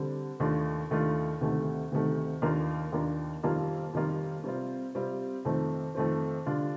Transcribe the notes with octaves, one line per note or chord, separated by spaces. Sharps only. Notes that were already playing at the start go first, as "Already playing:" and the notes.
Already playing: D3 G3 C4
D#2 D#3 A3 D4 F4
D#2 D#3 A3 D4 F4
D2 C3 D#3 A3
D2 C3 D#3 A3
D#2 D#3 A#3 D4 F4
D#2 D#3 A#3 D4 F4
F2 D#3 G3 A#3 F4
F2 D#3 G3 A#3 F4
C3 G3 C4 F4
C3 G3 C4 F4
F2 D#3 A3 C4
F2 D#3 A3 C4
D3 G3 D4 F4